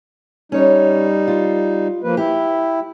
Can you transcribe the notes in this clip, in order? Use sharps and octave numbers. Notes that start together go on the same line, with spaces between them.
G3 C#4 D#4 C#5
F4
F3 A#3 B4
E4 G4